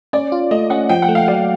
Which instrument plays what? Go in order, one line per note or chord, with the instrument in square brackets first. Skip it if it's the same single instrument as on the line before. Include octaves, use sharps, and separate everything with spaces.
[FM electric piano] C#4 [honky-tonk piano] D5
[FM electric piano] F4
[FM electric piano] A3 [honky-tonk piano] D#5
[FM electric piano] C#4 [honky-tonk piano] F#5
[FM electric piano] F3 [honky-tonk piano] G5
[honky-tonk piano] F#5
[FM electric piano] A3
[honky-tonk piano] F5
[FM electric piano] F#3 [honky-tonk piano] D5